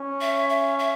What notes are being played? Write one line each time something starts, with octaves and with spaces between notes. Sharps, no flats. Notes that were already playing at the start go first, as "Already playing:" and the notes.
Already playing: C#4
E5
E5
E5